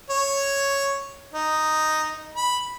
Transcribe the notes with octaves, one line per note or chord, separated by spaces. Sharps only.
C#5
D#4
B5